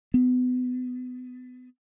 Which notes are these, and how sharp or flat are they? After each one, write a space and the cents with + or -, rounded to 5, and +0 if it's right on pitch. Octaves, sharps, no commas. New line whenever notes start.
B3 +30